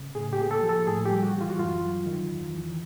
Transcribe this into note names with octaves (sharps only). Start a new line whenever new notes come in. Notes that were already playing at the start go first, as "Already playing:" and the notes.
Already playing: C#3
A2 G#4
G4
A#3 G#4
A4
F3
A4
A2 G#4
G4
G3
F#4
E3
F4
F#4
F#2 F4
F#3
D#3
E2
E3